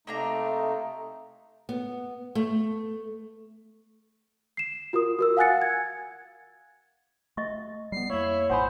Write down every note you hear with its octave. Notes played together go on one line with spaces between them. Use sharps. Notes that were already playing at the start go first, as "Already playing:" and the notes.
C3 A3 A#3 D4 D#4 A#5
B3
A3
C7 E7
F4 F#4 A#4 D#6
F#4 A#4 E6
F5 F#5 G#5 F#6 A6 C#7
G#6
A3 D#5 E5 C#6
G3 G#3 B3 C7
F2 A#3 E4 C#5
A1 A2 D#4 C5 F#5 G#5 B5